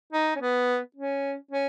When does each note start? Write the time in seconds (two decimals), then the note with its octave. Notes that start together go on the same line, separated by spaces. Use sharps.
0.12 D#4
0.36 C#4
0.41 B3
0.96 C#4
1.51 C#4